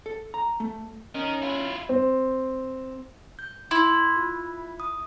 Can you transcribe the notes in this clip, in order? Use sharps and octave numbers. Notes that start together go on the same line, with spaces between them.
A4
A#5
A3
C#4 D#4 A#4
E4 F4
C4
G6
E4 C6
F4
D#6